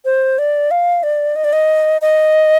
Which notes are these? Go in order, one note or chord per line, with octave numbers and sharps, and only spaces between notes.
C5
D5
F5
D5
D#5
D5
D#5
D#5